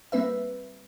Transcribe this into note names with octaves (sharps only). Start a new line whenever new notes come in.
G3 A#3 C4 B4 E5